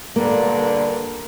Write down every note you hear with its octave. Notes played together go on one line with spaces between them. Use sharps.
G2 A#2 D3 A#3